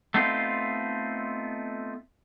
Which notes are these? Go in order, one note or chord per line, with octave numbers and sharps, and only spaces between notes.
A3 B3 C4 D#4 F4